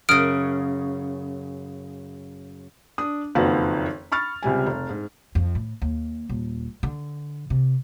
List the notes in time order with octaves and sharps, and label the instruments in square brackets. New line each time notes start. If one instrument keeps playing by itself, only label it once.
[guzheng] F#2 C#3 [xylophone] D#6 F6 D7
[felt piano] D4 D#6
F#1 F2 D#3 F#4 B4 F5
B5 C#6 F6 A6
C#2 C3 G3 G#5
F1
G#2
[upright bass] F2
A2
D#2
D#1
D3
C3